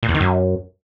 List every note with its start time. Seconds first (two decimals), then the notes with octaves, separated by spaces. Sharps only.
0.03 A#2
0.09 E2
0.14 D#3
0.20 F#2